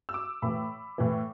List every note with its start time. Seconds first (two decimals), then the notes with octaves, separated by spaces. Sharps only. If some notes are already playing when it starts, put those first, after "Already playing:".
0.09 E6
0.14 D6
0.42 A2 E3 B5
0.98 A2 E3